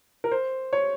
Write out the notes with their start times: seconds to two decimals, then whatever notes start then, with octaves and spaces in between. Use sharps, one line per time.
0.24 A#4
0.32 C5
0.73 C#5